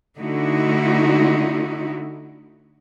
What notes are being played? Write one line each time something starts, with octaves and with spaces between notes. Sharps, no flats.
D3 A3 D#4 E4 F#4